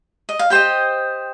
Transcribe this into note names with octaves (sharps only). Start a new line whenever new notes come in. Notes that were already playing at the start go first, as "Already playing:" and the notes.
D#5
F5
G4 C5 D#5 G5